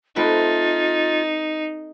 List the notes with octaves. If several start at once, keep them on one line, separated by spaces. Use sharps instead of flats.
A3 C4 D#4 F4 B4